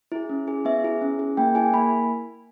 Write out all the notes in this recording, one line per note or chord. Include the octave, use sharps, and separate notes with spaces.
E4 G#4
C#4
G#4
B3 E5
E4 G#4
C#4
G#4
A#3 G5
E4 G#4 G#5
A#3 B5